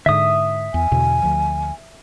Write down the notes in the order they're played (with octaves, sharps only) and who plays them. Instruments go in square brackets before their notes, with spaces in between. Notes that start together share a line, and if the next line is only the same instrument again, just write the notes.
[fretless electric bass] G#2 D3 [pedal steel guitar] E5 D#6
[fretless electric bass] E2 [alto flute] G#5
[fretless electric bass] E2 B2 D3
D2 F3